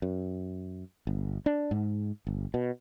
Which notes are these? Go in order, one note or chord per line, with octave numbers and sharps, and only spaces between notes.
F#2
G1
D4
G#2
G1
B2